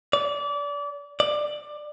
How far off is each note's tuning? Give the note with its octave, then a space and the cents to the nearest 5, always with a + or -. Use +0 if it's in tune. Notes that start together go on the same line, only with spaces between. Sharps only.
D5 -30
D5 +15